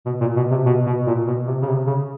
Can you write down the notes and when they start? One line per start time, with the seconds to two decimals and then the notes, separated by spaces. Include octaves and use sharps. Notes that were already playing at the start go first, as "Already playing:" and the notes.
0.06 B2
0.21 A#2
0.36 B2
0.51 C3
0.66 B2
0.86 B2
1.07 A#2
1.27 B2
1.47 C3
1.62 C#3
1.68 C3
1.87 C#3